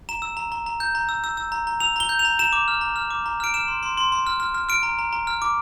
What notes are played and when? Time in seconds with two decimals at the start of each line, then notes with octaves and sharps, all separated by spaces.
0.09 A#5 E7
0.22 E6
0.37 A#5
0.52 A#5
0.66 A#5
0.80 G6
0.95 A#5
1.09 E6
1.24 E6
1.37 E6
1.52 A#5
1.67 A#5
1.80 E6 F7
1.96 A#5 G7
2.09 G6
2.19 F7
2.25 A#5
2.39 A#5 E7
2.53 D6
2.68 F6
2.81 A#5
2.96 F6
3.10 D6
3.26 A#5
3.40 F6 D7
3.54 F6 E7
3.68 C6
3.83 C6
3.97 C6
4.12 C6
4.27 F6
4.40 F6
4.54 F6
4.69 F6 D7
4.83 A#5
4.99 A#5
5.13 A#5
5.27 F6
5.42 D6